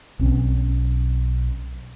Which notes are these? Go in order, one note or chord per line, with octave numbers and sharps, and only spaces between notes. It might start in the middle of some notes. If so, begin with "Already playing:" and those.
B1 C4 C#4